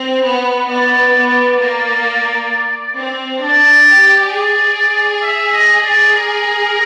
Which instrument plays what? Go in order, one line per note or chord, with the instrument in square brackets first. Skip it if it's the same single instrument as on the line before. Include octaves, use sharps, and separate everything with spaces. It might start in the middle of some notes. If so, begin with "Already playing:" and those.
Already playing: [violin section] C4
B3
[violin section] B3 [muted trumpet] D5
[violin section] B3
A#3
C4
[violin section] D4 [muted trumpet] D5
[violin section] G4
[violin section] G#4 [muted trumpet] D5
[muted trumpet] E5
D#5
D5
A#4